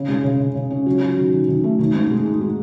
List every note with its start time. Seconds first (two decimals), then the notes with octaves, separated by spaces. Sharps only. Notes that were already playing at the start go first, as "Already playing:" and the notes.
Already playing: C#3
0.08 G#3
0.24 C#3
0.40 C#3
0.56 C#3
0.70 C#4
0.86 F#3
1.02 F#3
1.17 D#3
1.33 D#3
1.48 D#3
1.64 A3
1.79 D#3
1.95 G#2
2.10 G#3
2.26 D#4
2.41 G#3